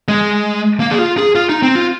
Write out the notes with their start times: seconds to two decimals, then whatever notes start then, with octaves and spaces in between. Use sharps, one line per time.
0.08 G#3
0.80 A#3
0.91 G#4
0.99 F4
1.18 G#4
1.35 F4
1.49 D#4
1.62 C4
1.75 F4